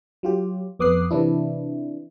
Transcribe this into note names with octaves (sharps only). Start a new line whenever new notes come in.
F#3 F4 G4
F2 B3 D6 D#6 F#6 C7
C3 E3 D4 E4